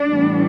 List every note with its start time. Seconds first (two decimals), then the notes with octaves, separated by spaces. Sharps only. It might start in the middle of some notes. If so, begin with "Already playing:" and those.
Already playing: D4
0.09 A2 E3 G3 B3